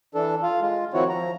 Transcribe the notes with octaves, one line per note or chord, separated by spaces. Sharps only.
E3 D4 A4
F4 F5
G#3 F4
D#3 F3 C4 E4 F#4 C#5
F3 A#5